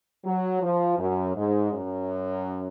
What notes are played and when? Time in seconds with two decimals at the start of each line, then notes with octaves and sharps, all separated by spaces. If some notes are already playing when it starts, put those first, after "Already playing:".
0.25 F#3
0.62 F3
0.98 F#2
1.35 G#2
1.73 F#2